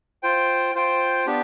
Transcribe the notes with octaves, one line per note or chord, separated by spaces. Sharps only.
F4 C5 G5
F4 C5 G5
B3 D4 G4